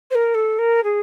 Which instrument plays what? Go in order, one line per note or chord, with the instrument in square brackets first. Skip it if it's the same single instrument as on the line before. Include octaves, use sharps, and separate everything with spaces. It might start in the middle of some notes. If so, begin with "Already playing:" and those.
[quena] C5
A#4
A4
A#4
G#4